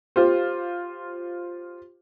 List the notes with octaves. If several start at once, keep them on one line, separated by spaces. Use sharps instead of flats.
F4 G4 C5